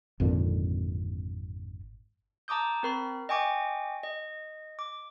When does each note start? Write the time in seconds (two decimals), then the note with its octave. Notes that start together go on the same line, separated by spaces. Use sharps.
0.20 G#1 F2 A#2 D3
2.48 A5 A#5 D6 D#6 G6
2.83 C4 A#4 B5
3.29 D#5 G5 G#5 C#6 D6
4.03 D#5
4.79 D6